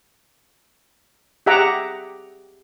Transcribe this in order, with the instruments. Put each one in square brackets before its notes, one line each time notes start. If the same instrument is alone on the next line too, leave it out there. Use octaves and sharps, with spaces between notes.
[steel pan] G4 G#4 E5 F#5 A#5 D6